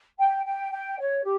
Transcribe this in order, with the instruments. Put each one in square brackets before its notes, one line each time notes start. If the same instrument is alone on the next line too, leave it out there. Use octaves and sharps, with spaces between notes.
[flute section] G5
G5
G5
C#5
G4